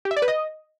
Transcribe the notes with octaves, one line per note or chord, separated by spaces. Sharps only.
G4
E5
D5
B4
D#5